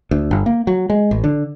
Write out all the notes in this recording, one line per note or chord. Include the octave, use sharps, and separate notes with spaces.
D2
G1
A#3
F#3
G#3
A1
D3